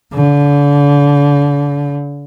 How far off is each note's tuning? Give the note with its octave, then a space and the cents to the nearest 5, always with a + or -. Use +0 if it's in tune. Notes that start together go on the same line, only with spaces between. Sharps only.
D3 -35